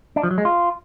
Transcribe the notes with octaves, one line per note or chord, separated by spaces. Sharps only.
D4
F3
F#3
G#3
F4